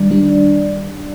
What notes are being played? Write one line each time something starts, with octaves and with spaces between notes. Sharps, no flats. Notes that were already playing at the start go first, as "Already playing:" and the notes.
Already playing: D#3 G3 D4 D5
D#3 G3 D4